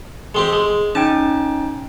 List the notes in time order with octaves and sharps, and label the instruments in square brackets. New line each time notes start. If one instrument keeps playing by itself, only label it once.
[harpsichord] G#3 C4 G4
G#3
[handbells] C#4 D#4 G5 [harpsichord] A5